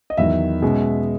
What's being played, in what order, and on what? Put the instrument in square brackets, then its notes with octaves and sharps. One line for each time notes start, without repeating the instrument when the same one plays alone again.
[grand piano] D#5
E2 D#3 F#3 E5
B2 G#3 C#4